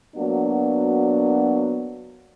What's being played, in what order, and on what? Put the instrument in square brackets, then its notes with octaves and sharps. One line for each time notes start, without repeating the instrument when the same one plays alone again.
[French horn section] F#3 A#3 B3 D4 F#4